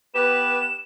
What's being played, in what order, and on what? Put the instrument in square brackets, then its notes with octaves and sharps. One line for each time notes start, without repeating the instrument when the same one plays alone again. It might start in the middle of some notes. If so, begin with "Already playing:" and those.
[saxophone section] B3 G4 B4 [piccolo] E7